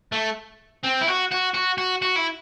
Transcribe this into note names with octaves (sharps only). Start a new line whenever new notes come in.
A3
C4
E4
F#4
F#4
F#4
F#4
F#4
E4